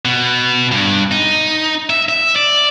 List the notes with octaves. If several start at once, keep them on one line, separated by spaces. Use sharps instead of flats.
B2
G2
D#4
E5
E5
D5